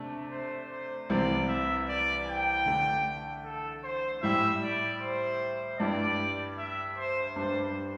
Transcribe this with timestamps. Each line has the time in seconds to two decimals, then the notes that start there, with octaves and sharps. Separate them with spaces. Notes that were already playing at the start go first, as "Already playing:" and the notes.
Already playing: C3 A3 D4
0.31 C5
0.71 C5
1.10 C2 C3 E3 G3 C4 D5
1.49 E5
1.88 D5
2.27 G5
2.66 D3 A3 D4
3.44 A4
3.84 C5
4.22 A2 G3 E4 G4 E5
4.62 D5
5.01 C5
5.79 G2 G3 E4 G4 D5
6.58 E5
6.97 C5
7.36 G2 G3 D4 C5